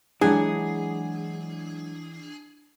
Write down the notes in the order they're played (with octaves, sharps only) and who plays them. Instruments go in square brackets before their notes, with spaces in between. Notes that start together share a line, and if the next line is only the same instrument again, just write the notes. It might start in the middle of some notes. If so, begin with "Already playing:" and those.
[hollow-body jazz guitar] E3 [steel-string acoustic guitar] F#3 G#3 F#5 [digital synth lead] D4 [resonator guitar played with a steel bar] G#4